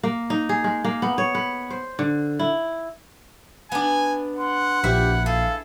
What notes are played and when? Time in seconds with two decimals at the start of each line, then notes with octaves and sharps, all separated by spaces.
0.03 A#3
0.30 D#4
0.49 G#4
0.64 G#3
0.85 A#3
1.02 B3
1.18 C#5
1.35 B4
1.70 C5
1.99 D3
2.39 E4
3.72 B3 D4 G#5
4.38 F#5 C6
4.84 A#1 E4 G4 E5
5.26 G#4 A4 F5